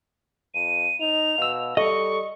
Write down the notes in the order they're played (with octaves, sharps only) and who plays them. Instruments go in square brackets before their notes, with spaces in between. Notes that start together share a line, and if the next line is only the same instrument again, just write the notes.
[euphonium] F2 [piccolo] D#7
[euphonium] D#4 [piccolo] F7
[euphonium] B2 [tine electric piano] F5 E6
[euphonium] G3 [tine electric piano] A4 [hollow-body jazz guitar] D#5 [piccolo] C#6